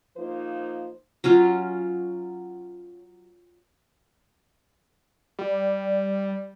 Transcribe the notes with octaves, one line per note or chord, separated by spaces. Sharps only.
F3 A#3 D#4 C5
F#3 C#4 F4
G3